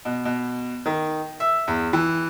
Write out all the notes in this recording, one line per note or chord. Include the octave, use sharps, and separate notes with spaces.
B2
B2
D#3
E5
E2
E3